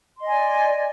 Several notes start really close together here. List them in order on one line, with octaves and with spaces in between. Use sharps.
C6 D#5 G#5 D5